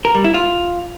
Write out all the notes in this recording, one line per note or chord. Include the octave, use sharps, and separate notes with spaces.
A#4
G3
E4
F4